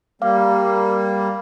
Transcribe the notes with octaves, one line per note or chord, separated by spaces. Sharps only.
G3 A#3 F5 D6